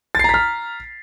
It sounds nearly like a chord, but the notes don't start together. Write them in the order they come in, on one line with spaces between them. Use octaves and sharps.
A6 C7 A#5 B6 F6